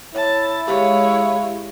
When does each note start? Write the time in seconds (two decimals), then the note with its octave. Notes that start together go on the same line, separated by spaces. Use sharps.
0.14 E4 C#5 A5
0.67 G#3 G4 C#5 F5